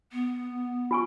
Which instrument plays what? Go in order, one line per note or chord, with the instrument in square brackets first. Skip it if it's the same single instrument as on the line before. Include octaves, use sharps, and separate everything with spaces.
[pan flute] B3
[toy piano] F4 G#5 C#6